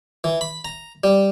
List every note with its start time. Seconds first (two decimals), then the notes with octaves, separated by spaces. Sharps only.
0.24 E3
0.41 B5
0.65 A#5
1.04 G3